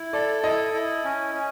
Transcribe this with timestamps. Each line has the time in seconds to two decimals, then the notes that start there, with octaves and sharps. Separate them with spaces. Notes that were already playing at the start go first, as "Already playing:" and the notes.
Already playing: E4
0.13 A4 D5
0.44 E4 D#5
0.74 E4
1.04 C#4
1.35 C#4